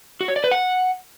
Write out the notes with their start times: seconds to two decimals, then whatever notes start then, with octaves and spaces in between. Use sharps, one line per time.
0.21 F#4
0.28 C#5
0.36 D5
0.44 B4
0.51 F#5